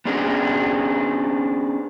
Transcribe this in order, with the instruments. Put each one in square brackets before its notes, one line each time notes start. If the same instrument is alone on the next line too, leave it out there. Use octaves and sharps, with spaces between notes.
[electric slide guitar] B3 C#4 D4 G#4 C5